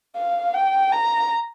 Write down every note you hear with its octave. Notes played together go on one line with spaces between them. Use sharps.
F5
G5
A#5